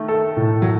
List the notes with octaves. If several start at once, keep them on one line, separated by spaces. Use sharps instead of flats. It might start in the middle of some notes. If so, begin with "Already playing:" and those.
Already playing: D#3 A3
A4
A2
F#3